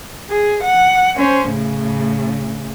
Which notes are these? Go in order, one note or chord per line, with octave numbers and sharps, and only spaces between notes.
G#4
F#5
C#4 C5
A2 C#3